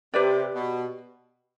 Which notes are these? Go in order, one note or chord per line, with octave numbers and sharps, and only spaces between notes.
C3 G4 B4 D5
B2